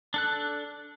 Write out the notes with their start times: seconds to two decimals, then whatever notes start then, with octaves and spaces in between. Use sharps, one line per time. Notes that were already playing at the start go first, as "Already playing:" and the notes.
0.14 D4 A4 F#6